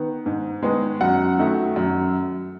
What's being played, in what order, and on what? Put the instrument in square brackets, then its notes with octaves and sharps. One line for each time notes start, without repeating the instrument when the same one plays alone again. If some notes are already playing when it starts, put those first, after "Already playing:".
Already playing: [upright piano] D#3 B3
G#2
D#3 G#3 B3
F#2 F#5
D#3 F#3 A3
F#2